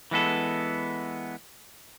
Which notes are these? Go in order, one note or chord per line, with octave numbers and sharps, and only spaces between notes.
E3 G#3 B3 A4